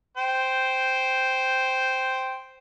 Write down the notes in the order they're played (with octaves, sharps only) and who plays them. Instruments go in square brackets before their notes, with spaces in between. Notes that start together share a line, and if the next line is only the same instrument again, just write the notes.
[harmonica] C5 G5